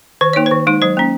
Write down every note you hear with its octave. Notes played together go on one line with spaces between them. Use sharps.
D#3 C5
A#3 D#4 C#5
C5
D#3
G#3 D#4
F#3 C5
A#3 C#4